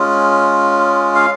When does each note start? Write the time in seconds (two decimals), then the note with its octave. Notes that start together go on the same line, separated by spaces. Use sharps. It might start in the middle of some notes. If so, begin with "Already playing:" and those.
Already playing: G#3 C#4 F4
1.15 F5